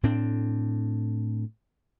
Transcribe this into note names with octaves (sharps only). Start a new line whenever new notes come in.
A2 C4 D4